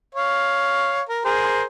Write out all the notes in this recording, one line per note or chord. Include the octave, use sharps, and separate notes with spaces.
C#5 F5
A#4
G#4 A#4 C5